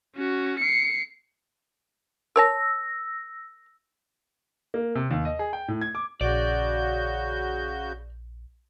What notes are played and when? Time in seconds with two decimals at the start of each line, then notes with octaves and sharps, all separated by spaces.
0.16 C#4 F#4
0.60 C7 C#7
2.36 A#4 C#5 A5 E6 A#6
4.74 A#3
4.95 C3
5.11 D#2
5.25 D#5
5.39 G#4
5.53 G5
5.68 A2
5.81 G#6
5.95 D6
6.21 A#1 C#3 F#4 D5 G6